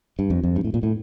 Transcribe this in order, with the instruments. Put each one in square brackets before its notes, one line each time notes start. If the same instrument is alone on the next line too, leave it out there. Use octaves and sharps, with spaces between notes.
[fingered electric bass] G2
F2
F2
G2
A2
A#2
A2